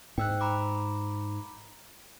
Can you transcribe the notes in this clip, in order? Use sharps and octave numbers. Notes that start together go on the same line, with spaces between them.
G#2 G5 E6 F#6
A#5 B5 D6